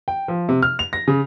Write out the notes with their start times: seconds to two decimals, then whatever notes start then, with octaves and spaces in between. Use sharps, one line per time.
0.08 G5
0.28 F3
0.49 C3
0.63 F6
0.79 F7
0.93 A#6
1.08 C#3